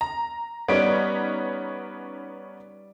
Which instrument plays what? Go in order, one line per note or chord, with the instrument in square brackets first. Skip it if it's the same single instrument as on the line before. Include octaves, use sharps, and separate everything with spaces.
[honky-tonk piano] A#5
[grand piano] G3 D5 D7 [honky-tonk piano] B3 C#4 D#4